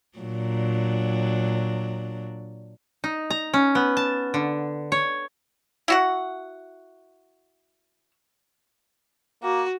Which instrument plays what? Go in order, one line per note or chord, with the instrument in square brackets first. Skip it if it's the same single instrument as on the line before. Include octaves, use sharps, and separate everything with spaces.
[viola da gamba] A#2 F#3 D4
[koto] D#4
A#5
C#4
B3
A5
D3
C#5
[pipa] E4 F#4 F#5
[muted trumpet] A#3 [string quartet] F#4